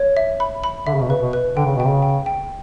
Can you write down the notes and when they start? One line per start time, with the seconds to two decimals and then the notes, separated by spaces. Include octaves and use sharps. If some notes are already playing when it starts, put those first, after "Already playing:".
Already playing: C#5
0.17 E5
0.40 B5
0.64 B5
0.86 D3 E5
0.94 C#3
1.01 B2
1.09 C#3 B4
1.22 B2
1.33 B4
1.56 D3 G5
1.66 C#3
1.76 B2 G5
1.86 C#3
2.02 G5
2.26 G5